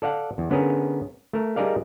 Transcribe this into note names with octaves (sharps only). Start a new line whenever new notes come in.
A4 D5 F5 F#5
E2
D3 B3 C#4 G#4 A#4
A3 A#4
G3 D#4 G#4 A#4 D5 F5